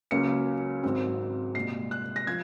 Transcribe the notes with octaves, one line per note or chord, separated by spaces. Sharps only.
C#2 C#3 F#3 A#3 C#4 C#7
G#1 G#2 F#3 C4
C2 A#2 G#3 C7
F#6
A#6
F3 G#6